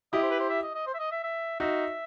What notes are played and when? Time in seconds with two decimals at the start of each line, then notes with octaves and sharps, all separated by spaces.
0.13 E4 G4 D#5
0.22 C5
0.30 B4
0.40 C5
0.50 E5
0.62 D#5
0.75 D#5
0.86 C5
0.94 E5
0.99 D#5
1.12 E5
1.24 E5
1.60 D#4 F#4 E5